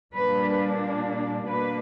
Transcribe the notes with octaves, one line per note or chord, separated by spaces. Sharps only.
A#2 G3 A#3 D4 B4
B2 A#3 D4 B4